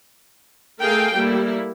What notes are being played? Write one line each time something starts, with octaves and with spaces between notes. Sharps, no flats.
A3 G#4 A#4 F5 G5
G3 A3 A#3 E4